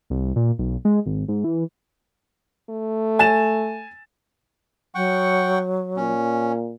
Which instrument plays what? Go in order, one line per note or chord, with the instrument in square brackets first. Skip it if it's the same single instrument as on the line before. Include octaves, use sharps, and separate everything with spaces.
[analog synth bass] C2
A#2
B1
G#3
G#1
G#2
E3
[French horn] A3
[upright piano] G#5 A6 E7
[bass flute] F#3 [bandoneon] F#5 G5 C#6
[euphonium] A#2 [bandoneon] C#4